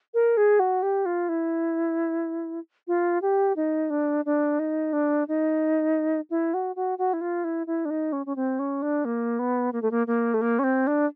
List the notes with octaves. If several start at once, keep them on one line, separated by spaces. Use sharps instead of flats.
A#4
G#4
F#4
G4
F4
E4
F4
G4
D#4
D4
D4
D#4
D4
D#4
E4
F#4
F#4
F#4
E4
F4
E4
E4
D4
D#4
C#4
C#4
C4
C#4
D4
A#3
B3
A#3
A3
A#3
A#3
A3
A#3
C#4
C4
D4